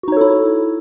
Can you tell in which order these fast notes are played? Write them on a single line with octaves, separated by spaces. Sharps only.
F#4 D#4 C#5 A4 E4